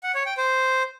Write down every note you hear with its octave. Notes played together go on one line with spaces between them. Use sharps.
F#5
C#5
G5
C5